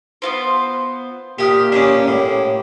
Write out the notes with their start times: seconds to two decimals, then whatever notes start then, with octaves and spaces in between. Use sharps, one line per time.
0.22 B3 F4 C5
1.39 A#2 A#3 G4 E5 D#6 F6
1.72 C#4 D4 G4 D6
2.08 A2